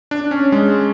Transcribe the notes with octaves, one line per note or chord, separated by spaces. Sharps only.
D4
C#4
G#3